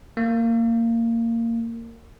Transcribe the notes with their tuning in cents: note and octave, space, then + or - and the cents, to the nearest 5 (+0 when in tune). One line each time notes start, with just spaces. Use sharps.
A#3 -20